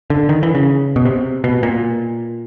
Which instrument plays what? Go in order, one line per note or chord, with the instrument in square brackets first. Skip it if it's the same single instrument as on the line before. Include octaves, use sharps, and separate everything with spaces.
[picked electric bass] D3
D#3
E3
C#3
B2
C3
B2
A#2